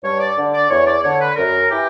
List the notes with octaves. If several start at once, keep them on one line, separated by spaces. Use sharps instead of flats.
G2 C#5
D5
D3
D5
E2 C#5
D5
D3 C#5
B4
F#2 A#4
E3 G4